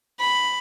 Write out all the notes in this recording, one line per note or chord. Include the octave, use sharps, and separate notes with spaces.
B5